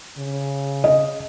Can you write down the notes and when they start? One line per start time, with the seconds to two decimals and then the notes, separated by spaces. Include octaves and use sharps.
0.18 C#3
0.84 D#5